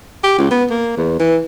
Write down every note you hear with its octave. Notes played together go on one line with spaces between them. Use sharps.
G4
C#2
B3
A#3
E2
E3